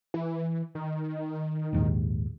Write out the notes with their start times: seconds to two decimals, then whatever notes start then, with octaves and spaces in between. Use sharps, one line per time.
0.14 E3
0.75 D#3
1.73 A#1 D#2 G#2